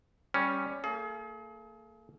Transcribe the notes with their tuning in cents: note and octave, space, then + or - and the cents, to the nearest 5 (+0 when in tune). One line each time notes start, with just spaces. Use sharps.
G3 +5 C#4 +0
A#3 -40 G#4 +40